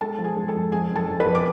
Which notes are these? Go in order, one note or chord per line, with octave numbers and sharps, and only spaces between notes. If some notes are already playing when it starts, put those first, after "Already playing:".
G#3 A4 A5
F3
G#4 G#5
G#3
A4 A5
F2
F2 G#4 G#5
F#1
A4 A5
F2
B4 B5
F2
D6